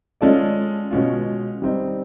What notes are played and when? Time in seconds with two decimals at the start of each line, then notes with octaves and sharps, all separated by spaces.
0.21 G#3 C#4 F4 A4 D5
0.91 B2 G#3 C#4 F4
1.62 G3 C4 D#4